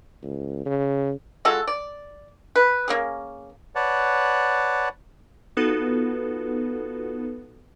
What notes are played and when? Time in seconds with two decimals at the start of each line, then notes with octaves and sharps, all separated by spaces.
0.22 C#2
0.66 C#3
1.45 G#3 F4 F#4 A4
1.67 D5
2.56 B4
2.88 A#3 C#4 G#4
3.75 B4 C#5 D5 F#5 A5
5.57 B3 D#4 F4 F#4 A4 B4